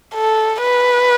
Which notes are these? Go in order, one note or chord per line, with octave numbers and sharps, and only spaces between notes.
A4
B4